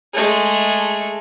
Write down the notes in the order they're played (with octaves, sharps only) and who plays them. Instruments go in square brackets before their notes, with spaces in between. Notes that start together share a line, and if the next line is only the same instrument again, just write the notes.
[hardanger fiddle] G#3 A3